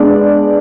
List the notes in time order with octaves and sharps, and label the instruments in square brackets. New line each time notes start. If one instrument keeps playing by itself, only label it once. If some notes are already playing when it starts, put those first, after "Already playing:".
Already playing: [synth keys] G#3 B3 D4